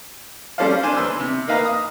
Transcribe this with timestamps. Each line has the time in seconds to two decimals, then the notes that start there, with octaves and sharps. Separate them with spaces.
0.58 G3 C#4 A4 C5 D5 F5
0.83 D4 C5 D5 G#5
0.97 E2 B4 C6 E6
1.20 C3
1.48 A#3 D#4 B4 F5 A#5
1.65 D#6